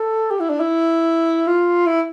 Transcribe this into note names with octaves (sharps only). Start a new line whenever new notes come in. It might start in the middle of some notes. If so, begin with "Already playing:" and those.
Already playing: A4
G4
E4
D4
E4
F4
E4